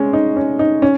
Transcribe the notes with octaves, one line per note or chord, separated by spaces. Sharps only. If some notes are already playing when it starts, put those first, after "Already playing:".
Already playing: G#3 C#4
D#4
C#4
D#4
C#4